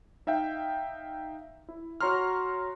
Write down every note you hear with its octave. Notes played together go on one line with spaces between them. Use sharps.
D#4 E5 F5 G5
E4
F#4 C#5 A#5 C6 F6